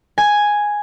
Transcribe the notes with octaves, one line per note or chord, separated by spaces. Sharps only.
G#5